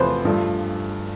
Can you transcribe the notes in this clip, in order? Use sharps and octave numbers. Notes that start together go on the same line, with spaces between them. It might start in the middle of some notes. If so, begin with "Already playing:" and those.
Already playing: E2 C3 F3 A3 B4 C5
G2 F3 A3